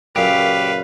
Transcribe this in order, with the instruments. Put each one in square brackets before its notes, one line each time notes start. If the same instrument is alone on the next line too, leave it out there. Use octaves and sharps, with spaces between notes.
[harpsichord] F#2 A#2 C#3 [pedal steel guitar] G4 [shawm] B4 [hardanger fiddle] F5